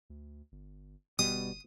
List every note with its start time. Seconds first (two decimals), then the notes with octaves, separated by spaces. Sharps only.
0.10 D2
0.52 G1
1.19 G1 B2 G3 D#6